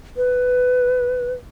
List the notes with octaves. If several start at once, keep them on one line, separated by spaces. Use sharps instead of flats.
B4